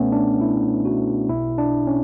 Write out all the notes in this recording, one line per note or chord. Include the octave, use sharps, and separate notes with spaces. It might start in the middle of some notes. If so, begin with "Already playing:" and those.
Already playing: C#2 B2 A3 B3 C#4
D4
E4
F#4
B1 B2 E4
D4
C#4